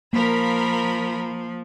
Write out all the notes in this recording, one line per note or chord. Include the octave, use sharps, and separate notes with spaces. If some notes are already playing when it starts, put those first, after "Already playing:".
F3 A#3 A#4 B5